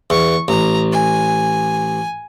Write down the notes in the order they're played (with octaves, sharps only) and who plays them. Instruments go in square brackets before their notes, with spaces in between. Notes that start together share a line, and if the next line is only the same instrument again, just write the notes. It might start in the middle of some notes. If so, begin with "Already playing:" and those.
[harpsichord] E2 [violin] C#6
[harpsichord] A1 [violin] A#5
[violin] G#5